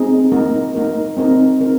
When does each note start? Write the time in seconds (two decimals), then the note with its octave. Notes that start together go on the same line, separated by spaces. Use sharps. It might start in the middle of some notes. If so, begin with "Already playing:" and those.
Already playing: C4 D#4 G#4
0.32 A#3 D#4 A#4
0.75 A#3 D#4 A#4
1.17 C4 D#4 A#4
1.61 C4 D#4 A#4